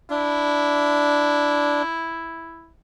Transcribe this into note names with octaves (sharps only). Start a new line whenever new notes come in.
D4 E4